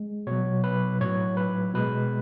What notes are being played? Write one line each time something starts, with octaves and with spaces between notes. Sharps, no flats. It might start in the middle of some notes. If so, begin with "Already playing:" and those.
Already playing: G#3
B2 F#3 C#5
B4
A2 F#3 C#5
B4
B2 G#3 B4